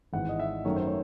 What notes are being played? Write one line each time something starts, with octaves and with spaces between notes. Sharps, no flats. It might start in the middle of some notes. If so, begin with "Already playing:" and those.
G#1 G#2 E3 F#5
D#5
E5
F#2 D#3 F#3 A3 C#5
C5
C#5